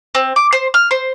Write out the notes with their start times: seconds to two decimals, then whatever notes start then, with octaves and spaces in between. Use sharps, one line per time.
0.15 C4
0.36 D6
0.53 C5
0.74 F6
0.91 C5